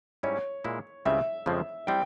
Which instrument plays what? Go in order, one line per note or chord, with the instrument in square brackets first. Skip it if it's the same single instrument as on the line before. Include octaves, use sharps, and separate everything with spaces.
[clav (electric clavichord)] G#2 G3 C#4 E4 [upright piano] C#5
[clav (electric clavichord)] A#2 G#3 E4
[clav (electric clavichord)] C#2 C#3 G3 C4 [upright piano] E5
[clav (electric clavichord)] F2 C#3 F3 G#3 C4
[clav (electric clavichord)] G3 C4 [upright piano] G5